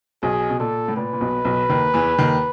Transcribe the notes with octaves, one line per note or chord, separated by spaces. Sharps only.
B1 B2 G#4
B2
A#2 A4
A2
A#2 B4
A#2
B1 B2
B1 B2
D#2 D#3
E2 E3
D#2 D#3